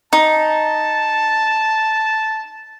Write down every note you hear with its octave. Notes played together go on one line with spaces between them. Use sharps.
D#4 A5